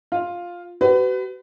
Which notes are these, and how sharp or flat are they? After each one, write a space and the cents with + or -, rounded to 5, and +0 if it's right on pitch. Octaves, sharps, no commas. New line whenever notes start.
F4 +5 F5 +5
F#4 +40 B4 +30